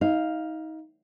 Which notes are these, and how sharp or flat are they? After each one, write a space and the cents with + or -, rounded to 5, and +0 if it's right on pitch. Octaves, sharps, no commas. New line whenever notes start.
D#4 +30 F5 +0